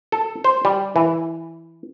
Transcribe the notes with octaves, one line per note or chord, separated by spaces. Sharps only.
A4
C5
G3
E3